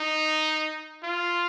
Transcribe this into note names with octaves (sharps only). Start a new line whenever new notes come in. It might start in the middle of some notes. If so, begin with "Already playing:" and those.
Already playing: D#4
F4